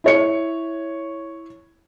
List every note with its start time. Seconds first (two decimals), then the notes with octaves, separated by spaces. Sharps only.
0.04 E4 C#5 C#7